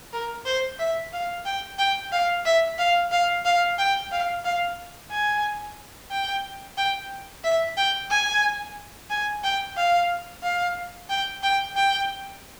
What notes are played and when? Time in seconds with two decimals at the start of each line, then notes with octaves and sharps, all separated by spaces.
0.13 A#4
0.46 C5
0.79 E5
1.12 F5
1.45 G5
1.79 G5
2.12 F5
2.45 E5
2.79 F5
3.11 F5
3.45 F5
3.78 G5
4.11 F5
4.44 F5
5.11 G#5
6.11 G5
6.77 G5
7.44 E5
7.77 G5
8.10 G#5
9.10 G#5
9.44 G5
9.77 F5
10.43 F5
11.09 G5
11.43 G5
11.76 G5